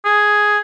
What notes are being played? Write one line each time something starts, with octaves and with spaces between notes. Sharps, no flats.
G#4